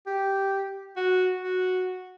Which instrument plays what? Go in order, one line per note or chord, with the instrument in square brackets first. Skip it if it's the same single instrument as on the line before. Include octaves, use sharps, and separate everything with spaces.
[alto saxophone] G4
F#4
F#4